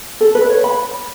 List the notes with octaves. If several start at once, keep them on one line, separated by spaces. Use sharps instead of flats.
A4
B4
C#5
B5